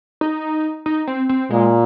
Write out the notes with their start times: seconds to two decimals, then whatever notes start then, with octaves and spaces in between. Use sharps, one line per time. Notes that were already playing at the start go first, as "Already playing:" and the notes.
0.21 D#4
0.86 D#4
1.07 C4
1.29 C4
1.50 A#2 G#3